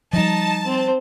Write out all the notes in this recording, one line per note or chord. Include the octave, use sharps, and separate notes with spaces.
F3 G3 D#4 A5
C4 C5